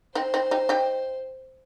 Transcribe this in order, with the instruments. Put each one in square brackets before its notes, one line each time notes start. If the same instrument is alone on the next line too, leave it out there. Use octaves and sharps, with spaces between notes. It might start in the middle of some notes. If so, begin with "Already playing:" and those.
[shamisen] C4 D#4 [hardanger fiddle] C5
[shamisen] C4 D#4
D#4 G4
D#4 G4